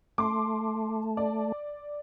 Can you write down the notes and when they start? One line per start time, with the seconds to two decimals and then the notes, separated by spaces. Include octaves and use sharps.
0.18 A3 C6 D6
1.17 D5